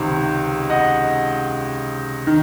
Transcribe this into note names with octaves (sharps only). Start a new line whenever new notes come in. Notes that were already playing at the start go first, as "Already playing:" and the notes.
Already playing: C#2 C3 D#3
D#5 F#5
D#3